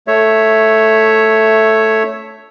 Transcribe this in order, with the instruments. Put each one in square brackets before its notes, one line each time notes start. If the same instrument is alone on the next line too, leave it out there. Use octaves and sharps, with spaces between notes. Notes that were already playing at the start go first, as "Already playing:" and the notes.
[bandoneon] A3 C#5 E5